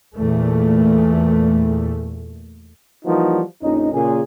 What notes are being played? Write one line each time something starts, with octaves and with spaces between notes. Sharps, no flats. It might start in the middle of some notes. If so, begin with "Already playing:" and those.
E2 A#2 A3
E3 F3 G3 A#3 D#4 F#4
A#1 F2 C#4 D#4
A#2 C#3 G#4